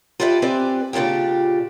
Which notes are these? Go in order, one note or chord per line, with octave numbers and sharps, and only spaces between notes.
F4 G4 A4 B4 D5 E5
C4 G4 B4 C5 D5 G#5
A#2 C#3 D4 F4 G4